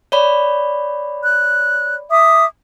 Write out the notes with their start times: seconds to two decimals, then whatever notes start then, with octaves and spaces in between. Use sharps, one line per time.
0.12 C#5 D5 B5
1.23 F#6
2.10 E5 D6 D#6